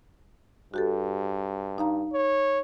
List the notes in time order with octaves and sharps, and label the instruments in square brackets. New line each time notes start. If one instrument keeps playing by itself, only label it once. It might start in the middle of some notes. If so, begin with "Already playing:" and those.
[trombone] G2 [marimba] F#4 G4 A4
[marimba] D#4 F5 A#5
[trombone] C#5